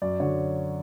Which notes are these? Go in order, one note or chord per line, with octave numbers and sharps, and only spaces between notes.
F#2 D5
D3 F#3 C#5